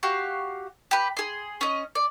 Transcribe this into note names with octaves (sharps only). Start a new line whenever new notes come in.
F#4 G4 F5
G4 B4
G#4 C6
C#4 D#5
D5